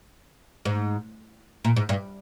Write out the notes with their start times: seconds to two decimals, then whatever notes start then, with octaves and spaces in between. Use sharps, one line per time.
0.65 G#2
1.65 A#2
1.76 G#2
1.89 G2